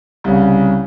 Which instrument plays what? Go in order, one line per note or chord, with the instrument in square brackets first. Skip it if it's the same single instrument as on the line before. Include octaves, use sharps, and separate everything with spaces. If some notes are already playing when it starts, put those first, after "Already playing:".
[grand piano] C2 C#3